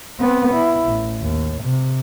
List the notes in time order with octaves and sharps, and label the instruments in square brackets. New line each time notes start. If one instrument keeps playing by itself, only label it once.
[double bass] B3 C4
E4
A1
D#2
C3